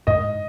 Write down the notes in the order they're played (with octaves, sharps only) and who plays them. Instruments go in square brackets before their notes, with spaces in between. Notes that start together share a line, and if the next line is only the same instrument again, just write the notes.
[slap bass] G#2 [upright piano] D#5